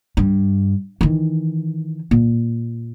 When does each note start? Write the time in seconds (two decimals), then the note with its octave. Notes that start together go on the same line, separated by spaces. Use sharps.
0.17 G2
1.01 D#3 E3
2.11 A#2